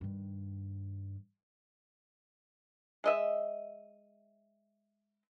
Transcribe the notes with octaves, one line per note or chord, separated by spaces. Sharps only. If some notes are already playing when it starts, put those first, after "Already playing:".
G2 D#3
G#3 D#5 E5